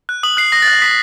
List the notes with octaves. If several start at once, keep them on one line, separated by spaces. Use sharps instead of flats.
F#6
D#6 F#7
F#6 C7
D#6 A#6
A6
F#6 A#6
D#6 B6